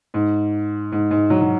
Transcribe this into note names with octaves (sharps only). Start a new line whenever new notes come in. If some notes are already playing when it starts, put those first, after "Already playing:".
G#2
G#2
G#2
F#3
F#3